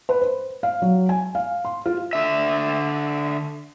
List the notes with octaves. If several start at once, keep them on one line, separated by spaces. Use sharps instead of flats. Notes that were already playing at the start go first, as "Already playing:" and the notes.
B4
C5
F5
F#3
G#5
F5
C6
F4
D3 E5